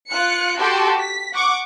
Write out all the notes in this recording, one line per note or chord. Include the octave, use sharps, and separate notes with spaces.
F4 F#6 C#7
F#4 G4 A4 G5 A5 C6
B6
F#5 C#6 D6